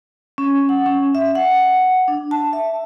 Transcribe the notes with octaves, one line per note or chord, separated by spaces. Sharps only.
C#4
F#5
C#4
E5
F#5
D4
A5
E5